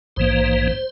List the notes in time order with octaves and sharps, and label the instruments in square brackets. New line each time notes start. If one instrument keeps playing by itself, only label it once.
[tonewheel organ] A#1 G#2 E3 A#3 C5